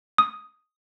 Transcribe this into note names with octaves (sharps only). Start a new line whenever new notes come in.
D#6